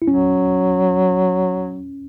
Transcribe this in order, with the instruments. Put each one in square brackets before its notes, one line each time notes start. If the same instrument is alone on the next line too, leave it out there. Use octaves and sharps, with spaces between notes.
[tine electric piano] E4
[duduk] F#3 [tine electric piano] C#4